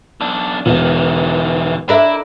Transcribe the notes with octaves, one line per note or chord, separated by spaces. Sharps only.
B1 D4
E1 D#3 E3
D4 E4 A#4 E5